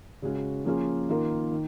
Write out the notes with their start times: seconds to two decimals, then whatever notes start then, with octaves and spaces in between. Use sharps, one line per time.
0.22 C#3 G#3 C#4 F#4
0.65 F3 A#3 C#4 F4 G#4
1.09 D#3 A#3 F4 A#4
1.51 D#3